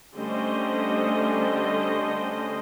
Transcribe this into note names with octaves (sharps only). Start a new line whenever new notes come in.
D3 G3 A3 C#4 C5 D#5